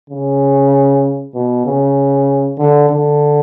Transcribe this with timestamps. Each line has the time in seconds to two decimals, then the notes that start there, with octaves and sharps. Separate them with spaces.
0.10 C#3
1.35 B2
1.66 C#3
2.58 D3
2.90 D3